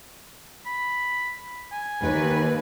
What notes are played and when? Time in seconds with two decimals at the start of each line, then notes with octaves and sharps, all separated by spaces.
0.66 B5
1.72 G#5
2.02 D#2 B4